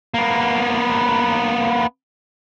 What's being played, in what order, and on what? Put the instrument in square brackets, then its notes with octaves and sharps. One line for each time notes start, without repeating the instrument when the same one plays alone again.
[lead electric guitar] A#3 B3